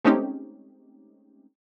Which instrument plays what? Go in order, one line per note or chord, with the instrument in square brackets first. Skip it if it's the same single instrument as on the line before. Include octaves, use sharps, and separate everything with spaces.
[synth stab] G#3 A3 C4 C#4 D#4 G4